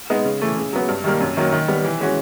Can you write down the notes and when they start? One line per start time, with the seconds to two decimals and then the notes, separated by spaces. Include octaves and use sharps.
0.10 G#3 B3 D#4
0.25 C#3
0.42 E3 A3
0.56 C#3
0.73 F#3 B3
0.89 G2
1.04 D#3 G3 A#3
1.20 F#2
1.37 D#3 F#3 A#3
1.52 D#3
1.68 G3 B3
1.85 E3
2.01 G#3 C#4 F#4